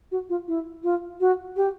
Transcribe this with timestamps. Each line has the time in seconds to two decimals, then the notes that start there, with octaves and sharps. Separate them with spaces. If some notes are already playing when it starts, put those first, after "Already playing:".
0.11 F#4
0.29 F4
0.48 E4
0.83 F4
1.20 F#4
1.56 G4